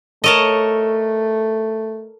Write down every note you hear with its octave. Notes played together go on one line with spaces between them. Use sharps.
A3 A4 A#4 C#5 D#5 A5